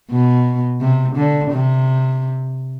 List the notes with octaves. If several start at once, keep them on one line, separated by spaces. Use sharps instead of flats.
B2
C3
D3
C3